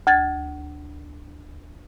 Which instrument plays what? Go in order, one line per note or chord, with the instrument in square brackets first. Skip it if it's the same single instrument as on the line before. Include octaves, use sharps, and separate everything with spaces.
[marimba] D2 G#6 A6